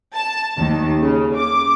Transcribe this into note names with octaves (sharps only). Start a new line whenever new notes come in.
A5
D#2
C#3
D6